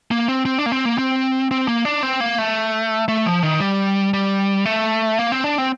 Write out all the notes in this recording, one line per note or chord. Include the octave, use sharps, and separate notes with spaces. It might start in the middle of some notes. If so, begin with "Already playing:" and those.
A#3
C4
C4
D4
A#3
C4
A#3
C4
C4
A#3
D4
C4
A#3
A3
A3
F3
D#3
G3
G3
A3
A#3
C4
D4
C4